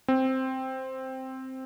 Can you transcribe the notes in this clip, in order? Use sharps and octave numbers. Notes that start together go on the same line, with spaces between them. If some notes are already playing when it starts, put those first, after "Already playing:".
C4